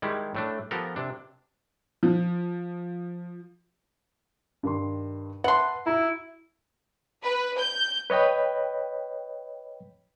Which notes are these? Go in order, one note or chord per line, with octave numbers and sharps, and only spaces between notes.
D#3 G3 G#3 E4 G4
A2 A3 D4
F3 B3 G4 A4 A#4
C3 D4
F3
G2 D#3 C6
B4 E5 F#5 A5 C6
E4 F#4 A#5
B4
G6
B4 C#5 D#5 G5 B5